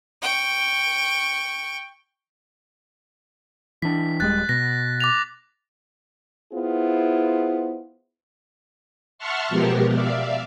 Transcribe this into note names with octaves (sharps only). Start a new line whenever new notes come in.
G5 C#6
E3 D4 B6
D#1 G3 G#3 F#6 A6
B2 A#6
D6 A6 F7
B3 E4 F4 G#4 C5
E5 F#5 A5 C6 C#6 F6
B2 F3 G#3 B3 G4 A#4
D5 E5 F5